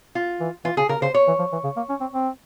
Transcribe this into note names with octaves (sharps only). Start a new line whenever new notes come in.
F4
E3
E3 F4
C#3 G#4
C#3 A#4
C#3 C5
C#5
E3
F3
E3
C#3
A#3
C#4
C4
C4